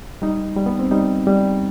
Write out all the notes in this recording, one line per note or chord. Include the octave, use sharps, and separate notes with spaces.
G3 D#4
G3
B3
C4
G3 D#4
G3